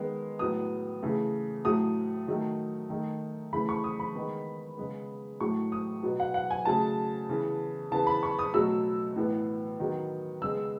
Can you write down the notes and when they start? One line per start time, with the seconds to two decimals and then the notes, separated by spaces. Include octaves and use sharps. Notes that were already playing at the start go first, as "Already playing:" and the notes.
Already playing: D#3 G#3 B3
0.39 A2 F#3 B3 D#6
1.03 C#3 E3 A3
1.65 A2 F#3 A3 D#6
2.28 D#3 F#3 A3
2.90 D#3 A3
3.53 C#3 E3 A3 B5
3.69 C#6
3.84 D#6
4.00 B5
4.15 D#3 G#3 B3
4.78 C#3 G#3 B3
5.41 A2 F#3 A3 C#6
5.72 D#6
6.03 B2 F#3 B3
6.20 F#5
6.34 F#5
6.51 G#5
6.65 C#3 F#3 A3 A5
7.29 C#3 E3 B3
7.91 C#3 E3 B3 A5
8.07 B5
8.23 C#6
8.39 D#6
8.53 B2 F#3 A3 E6
9.16 A2 E3 B3
9.80 D#3 F#3 B3
10.42 C#3 G#3 B3 E6